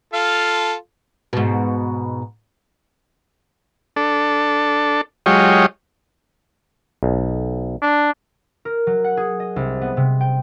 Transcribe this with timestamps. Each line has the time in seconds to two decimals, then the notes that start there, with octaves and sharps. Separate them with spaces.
0.14 F4 A4 F5
1.33 G#2 B2
3.96 D4 A4
5.26 F#3 G#3 F4 G4 C#5 D#5
7.03 B1
7.82 D4
8.65 A#4
8.87 F#3
9.04 F#5
9.17 G#4
9.40 D#5
9.56 C2
9.81 B3
9.97 C3
10.21 G5